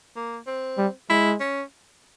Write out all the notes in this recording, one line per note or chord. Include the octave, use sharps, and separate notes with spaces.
A#3
C4
G3
G#3 E4
C#4